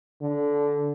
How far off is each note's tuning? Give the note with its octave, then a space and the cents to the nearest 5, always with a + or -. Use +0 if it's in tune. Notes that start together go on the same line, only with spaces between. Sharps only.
D3 -15